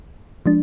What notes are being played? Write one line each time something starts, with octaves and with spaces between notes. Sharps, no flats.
F3 G#3 D4